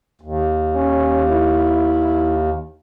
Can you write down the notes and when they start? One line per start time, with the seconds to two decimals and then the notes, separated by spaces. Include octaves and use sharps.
0.21 D#2
0.75 C#4
1.30 E4